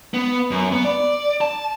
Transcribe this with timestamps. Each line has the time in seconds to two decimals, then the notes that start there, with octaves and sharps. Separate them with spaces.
0.14 B3
0.51 F#2
0.72 B3
0.85 D5
1.41 A5